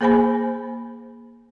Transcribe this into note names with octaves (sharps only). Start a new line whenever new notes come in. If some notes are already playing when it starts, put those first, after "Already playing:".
A#3 G#4 C5 G#5 B5